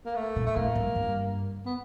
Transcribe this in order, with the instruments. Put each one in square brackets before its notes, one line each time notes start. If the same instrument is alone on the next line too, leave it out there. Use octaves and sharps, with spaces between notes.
[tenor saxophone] A#3
A3
[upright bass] A#2
[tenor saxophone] A3
[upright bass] A2 [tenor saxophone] A#3
[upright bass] G#2
G2
[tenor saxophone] B3